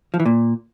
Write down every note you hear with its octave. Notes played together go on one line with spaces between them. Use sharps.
F3
E3
A#2